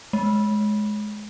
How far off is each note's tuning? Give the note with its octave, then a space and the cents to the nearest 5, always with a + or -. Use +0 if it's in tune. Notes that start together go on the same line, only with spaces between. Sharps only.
G#3 +20